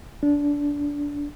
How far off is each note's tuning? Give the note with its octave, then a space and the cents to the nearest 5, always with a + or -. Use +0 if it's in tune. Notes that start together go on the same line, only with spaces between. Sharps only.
D4 -20